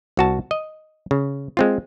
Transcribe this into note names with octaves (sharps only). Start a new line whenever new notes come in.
C2 F#4 A5
D#5
C#3
G#3 C4 F4